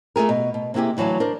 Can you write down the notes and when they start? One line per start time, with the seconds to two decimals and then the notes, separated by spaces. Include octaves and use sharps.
0.16 A3 F4 G#4 A#4
0.29 B2
0.54 B2
0.74 C3 A#3 E4 G4 G#4
0.97 D2 E3 F#3 F5 A5
1.20 D4 A#4 C5